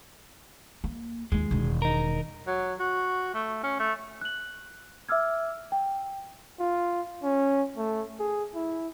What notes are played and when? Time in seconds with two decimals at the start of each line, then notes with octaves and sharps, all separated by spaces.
0.84 A#3
1.32 D#2 F3 G#3
1.51 E1 D#3
1.82 D#4 A#4
2.47 F#3
2.79 F#4
3.34 A3
3.63 C#4
3.79 A3
4.21 F#6 F#7
5.09 E5 D6 E6 F6 G#6
5.72 G5
6.60 F4
7.23 C#4
7.77 A3
8.19 G#4
8.55 E4